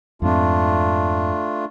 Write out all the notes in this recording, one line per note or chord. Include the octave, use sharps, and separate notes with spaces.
F2 G#2 A3 C4 D4 F4